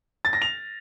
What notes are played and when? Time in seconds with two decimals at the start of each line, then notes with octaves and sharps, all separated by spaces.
0.25 A6
0.33 A#6
0.42 F7